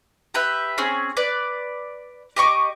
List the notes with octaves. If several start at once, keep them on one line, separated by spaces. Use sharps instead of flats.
G4 B4 E5
C4 C#4 G#4
B4 D5
G4 D#5 C#6 D6